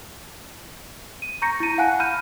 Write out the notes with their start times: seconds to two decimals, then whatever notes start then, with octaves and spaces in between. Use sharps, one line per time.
1.22 D#7
1.42 A#5 C#6 G6 A#6 C#7
1.60 E4 D#7
1.78 F5 F#5 G#5 A5 F#6
2.00 B5 F6 G6 D#7